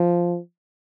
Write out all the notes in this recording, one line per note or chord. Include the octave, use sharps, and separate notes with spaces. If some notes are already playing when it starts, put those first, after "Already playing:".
Already playing: F3